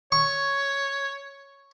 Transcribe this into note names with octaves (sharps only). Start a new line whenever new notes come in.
C#5 C#6